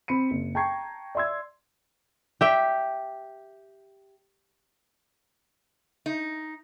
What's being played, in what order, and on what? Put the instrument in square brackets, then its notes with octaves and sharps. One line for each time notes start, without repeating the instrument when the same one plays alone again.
[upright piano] C4 B5 C#7 D#7
F#1
G5 A5 A#5 C#6 G#6 C7
D5 E5 C6 E6 G#6
[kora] G4 E5 G5
[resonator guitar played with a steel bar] D#4